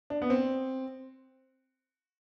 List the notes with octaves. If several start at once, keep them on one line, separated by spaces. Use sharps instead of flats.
D4
B3
C4